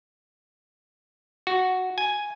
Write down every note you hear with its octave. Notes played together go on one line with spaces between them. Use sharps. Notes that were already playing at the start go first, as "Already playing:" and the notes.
F#4
G#5